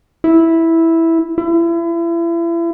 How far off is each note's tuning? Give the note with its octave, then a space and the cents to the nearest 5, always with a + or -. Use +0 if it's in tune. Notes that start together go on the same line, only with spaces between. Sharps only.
E4 -5
E4 +35